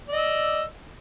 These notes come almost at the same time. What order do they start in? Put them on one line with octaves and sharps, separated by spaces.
D5 D#5 E6